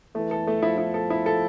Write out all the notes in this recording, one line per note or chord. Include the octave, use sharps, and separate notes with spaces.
E3 A3
A4
A3
F3 E4
E4
A4
E4
A4